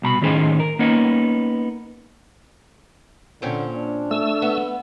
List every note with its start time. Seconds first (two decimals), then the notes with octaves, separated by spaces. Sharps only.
0.02 C2 B2 A#5 B5
0.22 A2 D#3 C#4 D#4 G#4 C5
0.60 A#4
0.79 A#3 B3 C#4 D#4
3.42 A#2 D3 C4 C#4
3.76 D4
4.11 A3 E6
4.42 B3